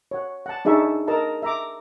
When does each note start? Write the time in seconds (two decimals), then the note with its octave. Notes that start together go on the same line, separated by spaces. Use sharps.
0.11 C#5 F#5
0.46 F#5 A5
0.65 D4 D#4 G#4 E5 A5 C#6
1.07 A#4 D#5 A5 A#5
1.42 E5 A#5 D6